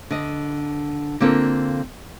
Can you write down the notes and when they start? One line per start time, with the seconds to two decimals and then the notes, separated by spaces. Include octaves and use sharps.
0.11 D3 D#5
1.20 D3 A#3 C4 F4 A4 A#4